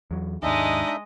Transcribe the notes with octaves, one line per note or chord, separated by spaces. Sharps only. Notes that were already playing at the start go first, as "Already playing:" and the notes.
E2 F#3
D#2 G#2 G#3 D4 D#4 D#5 E5